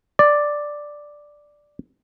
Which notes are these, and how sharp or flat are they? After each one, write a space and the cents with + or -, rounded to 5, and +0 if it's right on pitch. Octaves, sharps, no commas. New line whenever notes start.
D5 +5